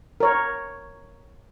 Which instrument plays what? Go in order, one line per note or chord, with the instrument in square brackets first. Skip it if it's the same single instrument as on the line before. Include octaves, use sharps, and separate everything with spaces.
[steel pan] A#4 C#5